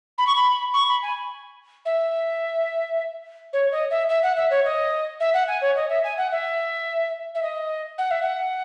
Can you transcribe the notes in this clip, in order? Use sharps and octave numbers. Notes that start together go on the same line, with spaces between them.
B5
C#6
B5
C#6
B5
G#5
E5
C#5
D#5
E5
E5
F#5
E5
C#5
D#5
E5
F#5
G#5
C#5
D#5
E5
G#5
F#5
E5
E5
D#5
F#5
E5
F#5